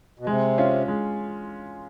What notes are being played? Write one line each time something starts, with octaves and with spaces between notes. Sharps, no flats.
B2
C3 G#3
C#4 F4
G#3